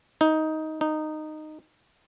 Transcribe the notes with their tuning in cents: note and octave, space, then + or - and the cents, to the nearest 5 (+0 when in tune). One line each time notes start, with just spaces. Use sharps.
D#4 +10
D#4 -15